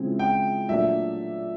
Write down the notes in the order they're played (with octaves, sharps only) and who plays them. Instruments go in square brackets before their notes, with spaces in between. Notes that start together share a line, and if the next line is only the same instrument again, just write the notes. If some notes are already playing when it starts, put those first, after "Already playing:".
Already playing: [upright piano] C#3 F3 G#3 C4 E4
[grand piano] G5
[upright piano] A#2 F#3 A3 D4 [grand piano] E5